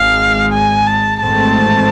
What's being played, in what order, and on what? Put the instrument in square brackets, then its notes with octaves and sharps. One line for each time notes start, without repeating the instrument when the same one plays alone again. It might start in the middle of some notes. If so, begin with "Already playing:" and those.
Already playing: [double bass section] G#1 G#2 G#3 [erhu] F5
[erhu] G#5
A5
[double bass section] G#1 G#2 E3 A3 C4 [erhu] A5